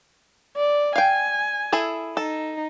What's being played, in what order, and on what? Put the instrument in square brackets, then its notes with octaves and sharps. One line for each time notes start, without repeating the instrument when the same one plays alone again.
[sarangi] D5
[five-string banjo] F5 G5 [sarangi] G#5
[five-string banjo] E4 G#4 A4
[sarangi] D#4 [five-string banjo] A4